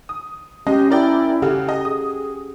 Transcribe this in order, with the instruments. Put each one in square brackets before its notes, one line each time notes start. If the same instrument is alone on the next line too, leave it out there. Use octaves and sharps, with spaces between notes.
[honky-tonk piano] D#6
[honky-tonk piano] G#3 D#5 [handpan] C#4 [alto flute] G4
[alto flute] E4 [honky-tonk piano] A#4 D5 G5
[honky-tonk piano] C#3 [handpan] G4 A4 F#5
[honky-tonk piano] D#5
[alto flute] G#4 [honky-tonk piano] D#6